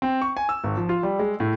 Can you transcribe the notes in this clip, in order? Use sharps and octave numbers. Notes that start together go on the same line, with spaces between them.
C4
C#6
G#5
E6
G#1
F3
F4
G3
G#3
A2